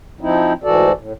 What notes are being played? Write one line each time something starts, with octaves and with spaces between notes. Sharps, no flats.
F3 C4 D#4 E4
D2 G#2 E3 F#4 A4 D5
A2